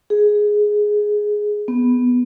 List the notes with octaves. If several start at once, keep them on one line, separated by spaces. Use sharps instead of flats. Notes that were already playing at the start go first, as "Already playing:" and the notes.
G#4
B3